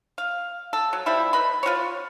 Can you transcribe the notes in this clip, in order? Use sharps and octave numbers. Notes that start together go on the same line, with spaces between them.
F5
A4
F#3
F3 G3 E4
B4 D#5 B5
F4 F#4 C5 C#5